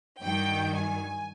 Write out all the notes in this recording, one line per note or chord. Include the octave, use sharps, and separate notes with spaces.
G2 D#3 F#3 G5
G#5